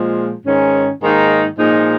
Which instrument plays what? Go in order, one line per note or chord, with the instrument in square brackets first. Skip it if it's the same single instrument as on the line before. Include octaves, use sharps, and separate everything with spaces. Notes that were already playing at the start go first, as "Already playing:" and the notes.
Already playing: [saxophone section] A#2 F3 G#3
G#2 D#3 C#4
G#2 D#3 A#3 D#4
A#2 F3 G#3 D#4